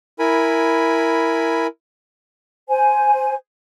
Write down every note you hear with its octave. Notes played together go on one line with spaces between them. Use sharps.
E4 A#4 G#5 B5
C5 G#5